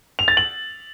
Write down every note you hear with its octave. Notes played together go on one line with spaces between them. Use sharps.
F7
A6
F#7